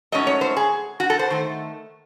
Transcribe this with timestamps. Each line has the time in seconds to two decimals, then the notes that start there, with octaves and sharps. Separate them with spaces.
0.12 G#2 F#3 A3 C#4 D#5
0.27 C#5
0.41 C5
0.57 G#4
1.00 F#4
1.10 A4
1.19 C5
1.30 D#3 A3